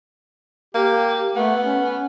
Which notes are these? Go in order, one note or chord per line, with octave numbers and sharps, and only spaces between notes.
A#3 G4
A3 B3
C#4